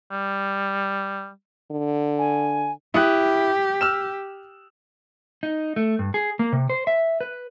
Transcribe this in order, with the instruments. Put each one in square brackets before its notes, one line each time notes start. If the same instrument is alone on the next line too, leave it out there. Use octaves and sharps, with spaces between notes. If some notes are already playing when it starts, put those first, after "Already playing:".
[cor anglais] G3
[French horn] D3
[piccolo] G#5
[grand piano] E4 D#6 F#6 [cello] G4
[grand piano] E6 F6 E7
[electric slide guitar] D#4
A3
G2
G#4
A#3
C3
C5
E5
B4